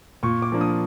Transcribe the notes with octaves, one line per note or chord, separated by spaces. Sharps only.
A#2 C#6
D6
F3 A#3 D4
D#6